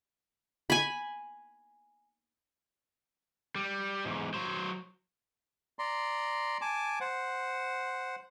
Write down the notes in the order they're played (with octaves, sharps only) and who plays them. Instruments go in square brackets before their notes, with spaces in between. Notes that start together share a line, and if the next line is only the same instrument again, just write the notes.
[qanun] G#5 B5
[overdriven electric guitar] G3
E2 G#2
F#3 C5
[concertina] D5 A#5 C6
G#5 A5 D6
C5 F#5